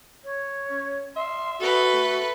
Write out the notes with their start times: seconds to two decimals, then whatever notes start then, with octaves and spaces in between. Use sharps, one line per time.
0.25 C#5
0.70 C#4
1.16 E5 C6
1.60 F#4 A4 B4
1.93 A3